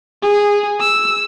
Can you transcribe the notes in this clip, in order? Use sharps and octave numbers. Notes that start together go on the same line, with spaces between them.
G#4
E6